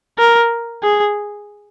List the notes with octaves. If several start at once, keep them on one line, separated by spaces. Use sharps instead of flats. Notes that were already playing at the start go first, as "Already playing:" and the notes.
A#4
G#4